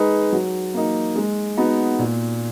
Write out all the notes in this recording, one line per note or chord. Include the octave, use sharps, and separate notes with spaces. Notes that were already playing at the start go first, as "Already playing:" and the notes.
Already playing: G#3 D#4 G#4 B4
F#3
A#3 D#4
G#3
B3 D#4 F#4
A#2